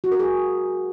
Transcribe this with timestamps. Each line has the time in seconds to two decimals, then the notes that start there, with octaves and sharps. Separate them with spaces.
0.04 F#4
0.12 A#4
0.19 G#4